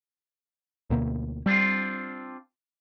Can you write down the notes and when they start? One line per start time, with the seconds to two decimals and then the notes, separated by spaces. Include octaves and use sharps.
0.90 D2 B2 A#3
1.46 G3 C4 D4 F4